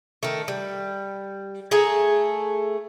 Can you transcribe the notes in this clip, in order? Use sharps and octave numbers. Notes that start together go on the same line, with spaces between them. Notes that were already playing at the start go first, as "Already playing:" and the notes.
D#3 A3
G3
A3 G#4 G#5 A#5